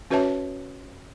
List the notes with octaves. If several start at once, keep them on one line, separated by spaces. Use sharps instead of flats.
C#4 F#4 B4 C#5 E5 A5